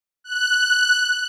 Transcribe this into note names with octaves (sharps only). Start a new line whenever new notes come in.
F#6